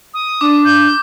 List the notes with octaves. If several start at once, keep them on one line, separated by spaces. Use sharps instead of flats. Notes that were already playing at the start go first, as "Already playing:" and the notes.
D#6
D4 D6
G6